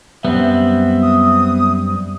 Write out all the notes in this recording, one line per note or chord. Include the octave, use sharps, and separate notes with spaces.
F#2 G3 B3 C4 E5
D#6